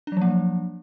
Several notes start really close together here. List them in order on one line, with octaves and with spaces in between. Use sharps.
D4 F#3 F3 A#3